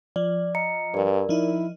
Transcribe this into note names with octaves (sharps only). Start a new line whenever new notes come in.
F3 D5
D#5 A#5 C#7
G2 A#4 D5
F3 D#4 E4